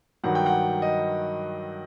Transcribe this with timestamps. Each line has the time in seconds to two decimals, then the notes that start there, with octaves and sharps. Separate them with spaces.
0.23 G2 D#3 F#3 F#5
0.35 G5
0.46 F#5
0.82 D#5